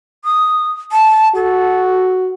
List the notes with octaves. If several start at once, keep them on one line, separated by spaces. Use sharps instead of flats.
D#6
A5
F#4 A4